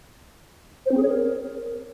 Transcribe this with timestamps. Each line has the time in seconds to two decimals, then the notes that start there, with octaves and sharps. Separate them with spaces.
0.86 C5
0.91 C4
0.97 G#4
1.03 C#5
1.09 A#4